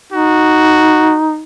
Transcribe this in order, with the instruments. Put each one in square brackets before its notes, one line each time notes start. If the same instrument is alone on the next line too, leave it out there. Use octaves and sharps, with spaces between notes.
[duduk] D#4 [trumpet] F#4